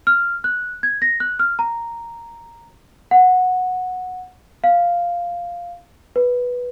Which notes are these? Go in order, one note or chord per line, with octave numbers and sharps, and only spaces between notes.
F6
F#6
G#6
A#6
F#6
F6
A#5
F#5
F5
B4